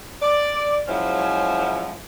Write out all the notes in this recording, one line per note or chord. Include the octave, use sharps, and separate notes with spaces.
D5
F3 F#3 G#3 C#4 E4 C5